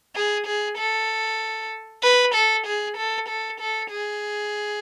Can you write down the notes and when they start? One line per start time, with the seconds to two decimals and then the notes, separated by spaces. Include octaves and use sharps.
0.15 G#4
0.46 G#4
0.78 A4
2.03 B4
2.34 A4
2.66 G#4
2.96 A4
3.28 A4
3.60 A4
3.91 G#4